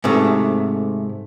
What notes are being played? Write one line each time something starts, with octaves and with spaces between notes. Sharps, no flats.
G#2 C3 A3